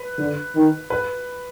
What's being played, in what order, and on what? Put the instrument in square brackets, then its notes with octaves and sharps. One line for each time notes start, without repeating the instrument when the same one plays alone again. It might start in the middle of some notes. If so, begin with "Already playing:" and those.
Already playing: [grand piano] B4
[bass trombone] D3
D#3
[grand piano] B4